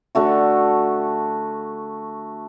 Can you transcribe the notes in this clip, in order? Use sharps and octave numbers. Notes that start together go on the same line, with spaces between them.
D3 A3 F#4